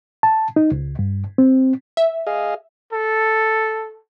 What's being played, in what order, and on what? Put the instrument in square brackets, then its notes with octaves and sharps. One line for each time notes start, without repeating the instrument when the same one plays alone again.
[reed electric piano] A5
D#4
C#2
G2
C4
[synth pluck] E5
[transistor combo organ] G#4 D#5 F5
[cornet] A4